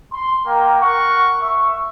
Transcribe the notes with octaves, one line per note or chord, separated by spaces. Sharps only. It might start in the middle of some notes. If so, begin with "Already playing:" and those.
C6
A#3 A#4 G5
A#4 F#5 C#6
E5 C#6